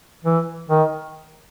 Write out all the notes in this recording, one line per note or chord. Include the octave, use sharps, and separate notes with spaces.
E3
D#3